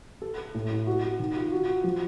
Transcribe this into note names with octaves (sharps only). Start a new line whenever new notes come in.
A4
A4
A2
E4
F#4
F#4
D#3
F4
F#4
F#4
F3